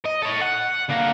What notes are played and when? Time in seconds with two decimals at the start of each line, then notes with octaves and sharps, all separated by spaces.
0.05 D#5
0.22 A4 C#5
0.41 F#5
0.89 D2 A#3